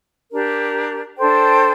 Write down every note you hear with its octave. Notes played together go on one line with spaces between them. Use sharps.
D4 G4 A#4
D4 A4 C5 G5